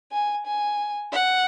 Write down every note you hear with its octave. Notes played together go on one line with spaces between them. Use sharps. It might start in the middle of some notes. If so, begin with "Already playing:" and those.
G#5
G#5
F#5